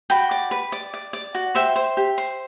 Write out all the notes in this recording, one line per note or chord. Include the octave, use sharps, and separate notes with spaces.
F#4 G5 B5
D5
B4
D5
D5
D5
F#4
C5 E5 G5
C5
G4
C5